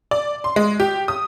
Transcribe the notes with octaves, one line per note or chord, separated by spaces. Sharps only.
D5
C6
G#3
G4
D#6